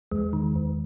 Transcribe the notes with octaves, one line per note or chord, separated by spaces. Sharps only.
E2 G#3
D#3
E2